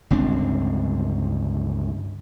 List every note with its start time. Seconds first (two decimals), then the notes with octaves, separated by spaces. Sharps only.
0.10 G1 C#2 C4 D4